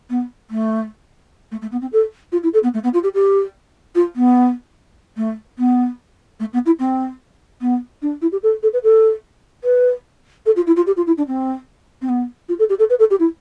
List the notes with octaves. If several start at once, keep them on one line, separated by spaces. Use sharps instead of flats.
B3
A3
A3
A3
B3
C4
A4
F4
E4
A4
B3
A3
B3
F4
G4
G4
F4
B3
A3
B3
A3
B3
E4
C4
B3
D4
E4
G4
A4
A4
B4
A4
B4
A4
F4
E4
F4
G4
F4
E4
D4
C4
C4
B3
F4
A4
G4
A4
B4
A4
G4
E4